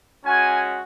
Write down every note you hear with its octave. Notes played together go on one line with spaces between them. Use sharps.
G#3 C#4 F#4 G#5